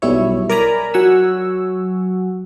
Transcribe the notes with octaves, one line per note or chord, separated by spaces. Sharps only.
B1 G3 E4 C#5
A#4 D5 G#5 A#5 B5
F#3 F#5 G#5 C#6 E6